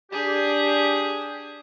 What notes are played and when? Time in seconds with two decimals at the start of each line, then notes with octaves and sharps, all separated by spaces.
0.12 D4 G4 G#4